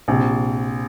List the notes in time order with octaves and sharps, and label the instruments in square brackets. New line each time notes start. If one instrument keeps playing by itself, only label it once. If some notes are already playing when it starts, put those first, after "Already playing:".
[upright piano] A#1 [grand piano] C3